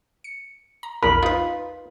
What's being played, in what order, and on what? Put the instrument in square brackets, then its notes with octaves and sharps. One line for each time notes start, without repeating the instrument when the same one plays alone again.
[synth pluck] C#7
A#5
[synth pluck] A#1 E2 [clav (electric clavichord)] A#4 [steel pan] B5
[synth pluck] D#4 B4 [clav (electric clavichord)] F4